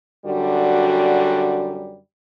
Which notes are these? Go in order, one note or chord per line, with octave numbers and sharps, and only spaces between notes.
F#2 D3 G3 F#4